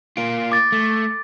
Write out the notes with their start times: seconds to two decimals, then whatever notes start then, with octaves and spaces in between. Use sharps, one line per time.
0.17 A#3 F4 D7
0.52 D6 A6
0.72 A3